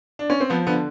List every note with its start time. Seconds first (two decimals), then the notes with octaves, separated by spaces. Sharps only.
0.19 D4
0.30 C#4
0.40 C4
0.50 F3 B3
0.67 D3 B3